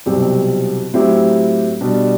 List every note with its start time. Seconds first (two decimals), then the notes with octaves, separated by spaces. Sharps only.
0.06 C2 B2 F#3 C4 G4
0.94 A2 F#3 C4 E4 G4
1.81 B2 G3 D4